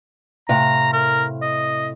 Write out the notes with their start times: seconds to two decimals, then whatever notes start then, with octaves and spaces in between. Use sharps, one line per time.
0.49 A2 C3 F5 A#5
0.93 A#4
1.42 D#5